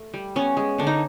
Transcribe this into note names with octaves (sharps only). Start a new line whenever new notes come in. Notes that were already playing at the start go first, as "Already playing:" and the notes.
Already playing: A3
G3
B3 C#4
G#3
D3 D4
D#4